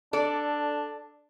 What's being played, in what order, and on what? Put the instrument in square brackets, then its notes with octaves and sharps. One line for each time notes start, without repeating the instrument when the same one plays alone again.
[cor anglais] D4 [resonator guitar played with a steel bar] A4 D5